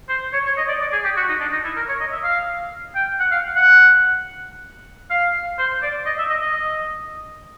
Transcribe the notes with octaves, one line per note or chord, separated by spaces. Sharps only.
C5
C#5
C#5
D#5
D5
D5
G#4
G4
F#4
D#4
D4
D#4
E4
A#4
C#5
D#5
E5
F5
G5
F#5
F5
F#5
F5
C5
D5
D#5
E5
D#5
D#5